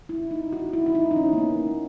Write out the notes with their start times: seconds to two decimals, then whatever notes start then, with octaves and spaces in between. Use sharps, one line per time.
0.09 E4
0.31 D#4
0.52 F#4
0.73 E4
0.86 E4
0.95 D#4
1.11 D#4
1.16 C#4
1.33 A#3
1.38 B3